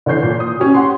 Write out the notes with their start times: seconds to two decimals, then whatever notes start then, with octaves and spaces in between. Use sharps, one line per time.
0.06 D3 E3 C#5 G6 C7
0.23 A#2
0.40 D#6
0.60 C#4 G4
0.75 F#5 C6